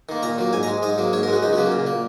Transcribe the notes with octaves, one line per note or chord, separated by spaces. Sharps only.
D#3 A#3
A#2 A#5
F#3 A#3
G#2 G#5
A#5
G#3
G#2 D#5
F#3 A#3
G#2 C#5
A#4
G#3 F#4
C#2 D#4
F#4
C#3 F#3 A#3
A#2
A#3